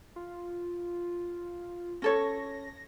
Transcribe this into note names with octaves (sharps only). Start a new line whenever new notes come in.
F4
C#4 A4 C#5 A#6